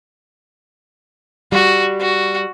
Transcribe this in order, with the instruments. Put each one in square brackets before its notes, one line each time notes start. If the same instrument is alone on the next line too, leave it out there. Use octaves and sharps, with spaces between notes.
[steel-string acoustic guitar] G3 [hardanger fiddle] F#4
[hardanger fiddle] F#4